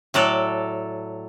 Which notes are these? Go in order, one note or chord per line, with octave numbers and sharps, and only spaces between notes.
A2 F#3 A4 D5